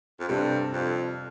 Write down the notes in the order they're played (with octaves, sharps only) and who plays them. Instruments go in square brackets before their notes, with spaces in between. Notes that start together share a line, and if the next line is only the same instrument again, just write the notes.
[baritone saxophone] F2
[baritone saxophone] G2 [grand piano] C3 G3 C4 A4
[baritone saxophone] F2